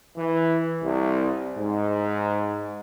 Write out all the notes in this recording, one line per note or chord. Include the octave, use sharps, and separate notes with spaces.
E3
C2
G#2